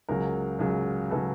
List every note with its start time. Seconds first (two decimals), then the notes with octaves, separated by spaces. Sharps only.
0.09 C#2 C#3 F#3 A#4
0.59 C#2 C#3 F#3
1.11 C#3 F#3 A4 B4